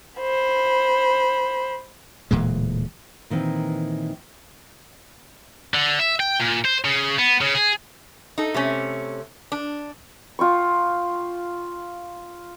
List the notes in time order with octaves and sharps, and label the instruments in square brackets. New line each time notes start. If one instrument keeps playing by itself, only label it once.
[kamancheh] C5 B5
[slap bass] D1 A#2 E3 G#3
[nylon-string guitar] A#2 D#3 E3 C4
[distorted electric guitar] D3
E5
G5
A#2
C5
C#3
B3
C#3
G#4
[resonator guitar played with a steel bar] D#4 A4
C3 A3 C#4
D4
[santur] F4 G5 C#6